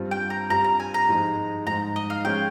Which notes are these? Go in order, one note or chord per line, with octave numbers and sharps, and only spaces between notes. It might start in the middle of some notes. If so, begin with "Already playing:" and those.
Already playing: G2 G3 C4 F4
G5
A#5
G2 G3 C4 F4 A#5
A#5
G#5
A#5
G#2 F3 G#3 D#4
G#2 F3 G#3 D#4 A#5
D#5
F5
F3 G#3 C#4 G5